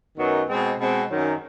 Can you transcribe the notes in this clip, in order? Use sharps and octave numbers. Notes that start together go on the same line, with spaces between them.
F#2 D#3 F#3 B3 D#4
B2 G#3 C4
B2 G#3 C4
F#2 D#3 F#3